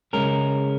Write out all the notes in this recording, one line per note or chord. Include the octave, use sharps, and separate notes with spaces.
C#3 G#3 C#4 A#4